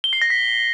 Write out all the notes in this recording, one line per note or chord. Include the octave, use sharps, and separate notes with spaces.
G7
C7
A#6
B6